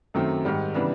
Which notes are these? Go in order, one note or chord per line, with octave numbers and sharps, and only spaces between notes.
F#2 D#3 F#3 A3 C4
G#2 D#3 G3
C#3 E3 G3 B3 D4